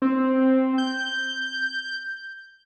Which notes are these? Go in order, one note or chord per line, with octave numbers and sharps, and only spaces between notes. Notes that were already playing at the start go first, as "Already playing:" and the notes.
C4
G6